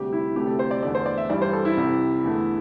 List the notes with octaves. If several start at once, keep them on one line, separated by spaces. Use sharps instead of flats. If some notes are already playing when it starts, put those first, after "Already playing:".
Already playing: D2 C3 G3 G4
E4
D2 C3 A3 G4
A4
C5
D5
E2 D3 A3 D5
C5
D5
E5
G2 E3 G3 D5
C5
A4
E4
C2 C3 G3
E2 D3 A3